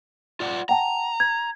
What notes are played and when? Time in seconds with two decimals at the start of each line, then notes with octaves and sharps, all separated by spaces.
0.40 F4 D5 F#5
0.69 F#5 G5 A5 A#5
1.20 G#6